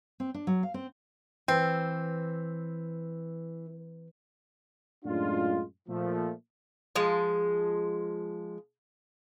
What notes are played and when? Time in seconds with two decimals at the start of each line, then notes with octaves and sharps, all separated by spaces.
0.20 C4
0.34 D4
0.47 F#3
0.63 F5
0.74 C4
1.48 E3 C4
5.05 F#2 A2 G#3 D4 F4
5.89 A#2 F3 A3
6.96 F3 G#3